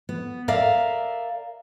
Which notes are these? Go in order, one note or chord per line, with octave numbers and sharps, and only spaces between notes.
B3
A#4 D5 E5 F5